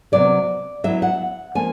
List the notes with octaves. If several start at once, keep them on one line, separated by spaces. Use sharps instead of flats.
C3 D#3 F#3 B3 D5
F#3 B3 E4 E5
F#5
F3 A#3 G#5